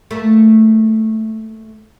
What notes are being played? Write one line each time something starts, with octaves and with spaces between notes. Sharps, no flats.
A3 A#3